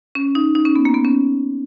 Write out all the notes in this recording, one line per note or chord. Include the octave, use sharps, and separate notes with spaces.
C#4
D#4
D#4
C#4
B3
A#3
B3
C#4